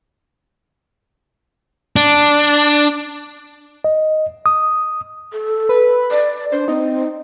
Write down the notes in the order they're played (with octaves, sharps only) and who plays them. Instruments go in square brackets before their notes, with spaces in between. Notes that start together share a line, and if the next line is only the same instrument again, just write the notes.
[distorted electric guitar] D4
[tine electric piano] D#5
D#6
[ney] A4
[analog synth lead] B4
[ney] D5
[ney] D4 [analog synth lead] C5
[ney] C4 [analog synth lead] D#4